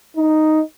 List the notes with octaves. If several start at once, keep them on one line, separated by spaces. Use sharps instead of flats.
D#4